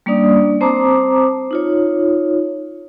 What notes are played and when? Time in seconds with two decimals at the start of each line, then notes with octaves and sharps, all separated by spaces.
0.06 G3 A#3 C#4 D4 D5 D#6
0.61 C4 C5 A5 A#5 D6 D#6
1.51 D#4 F4 C#5